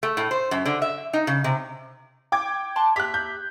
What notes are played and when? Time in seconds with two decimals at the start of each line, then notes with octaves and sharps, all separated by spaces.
0.03 A3
0.17 A2
0.31 C5
0.51 F#2
0.65 D3
0.82 E5
1.13 D#4
1.27 C#3
1.44 C3
2.32 G5 D6 G#6
2.76 A5 C6 F#6
2.96 G4 E5 A#5 F#6 B6
3.14 G6